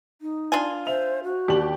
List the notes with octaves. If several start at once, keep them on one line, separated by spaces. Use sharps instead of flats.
D#4
D4 F4 G#5
C5 E5 F7
F#4
D#2 D4 G4 F#7